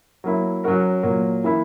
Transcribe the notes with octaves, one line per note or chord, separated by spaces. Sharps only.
F#3 A#3 E4
F#3 C#4 F#4 A#4
A#2 F#3 A#3
E3 A#3 E4